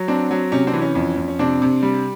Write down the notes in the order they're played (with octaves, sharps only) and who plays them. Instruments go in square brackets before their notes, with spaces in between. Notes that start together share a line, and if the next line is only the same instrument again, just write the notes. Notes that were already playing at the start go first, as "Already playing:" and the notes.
Already playing: [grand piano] F#3
C4 D4
F#3
C3 C#4
C4 D4
E3
C#4
F2
F2
C#4
C3 C4 D4
C3
G3